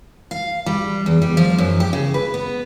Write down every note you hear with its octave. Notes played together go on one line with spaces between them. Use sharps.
F5
G3
E2
G3
F3
F#2
G4
C#3
B4
B3